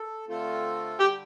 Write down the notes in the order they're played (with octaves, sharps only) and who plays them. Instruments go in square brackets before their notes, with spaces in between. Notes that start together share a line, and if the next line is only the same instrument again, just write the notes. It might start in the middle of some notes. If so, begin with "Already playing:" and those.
Already playing: [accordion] A4
D3 A3 C4 F4 A4
[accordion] D3 G3 [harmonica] G4